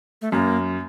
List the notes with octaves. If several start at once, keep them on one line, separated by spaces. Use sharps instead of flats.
A3
F#2 A#3